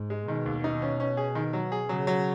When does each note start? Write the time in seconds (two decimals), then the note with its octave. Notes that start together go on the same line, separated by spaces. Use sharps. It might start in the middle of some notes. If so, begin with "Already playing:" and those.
Already playing: G#2
0.10 G#3
0.28 B2 D#3
0.46 D#2
0.64 D#4
0.82 C#4
1.00 C#4
1.17 G#4
1.35 D#3
1.53 F#3
1.72 G#4
1.89 C#3 F#3
2.07 F#3